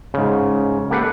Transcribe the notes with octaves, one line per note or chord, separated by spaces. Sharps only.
G#2 C#3
A#3 G4 A4 B4 F5 F#5